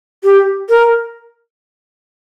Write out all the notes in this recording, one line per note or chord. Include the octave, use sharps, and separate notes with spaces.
G4
A#4